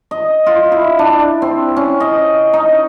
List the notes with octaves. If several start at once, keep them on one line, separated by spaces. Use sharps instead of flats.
D#5
F4
E4
D4
C4
C#4
D#5
D#4